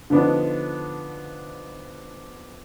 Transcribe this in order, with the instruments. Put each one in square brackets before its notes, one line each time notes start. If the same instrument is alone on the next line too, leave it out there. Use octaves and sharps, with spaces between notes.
[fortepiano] D3 F3 B3 D4 D#4